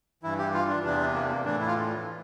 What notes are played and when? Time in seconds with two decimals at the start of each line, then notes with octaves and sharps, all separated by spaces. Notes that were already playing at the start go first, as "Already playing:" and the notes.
0.23 G2 E3 E4
0.38 G4
0.54 F4
0.68 D4
0.84 E2 C3 E3 D4
1.14 A#3
1.30 A#3
1.44 A2 E3 D4
1.60 E4
1.67 F4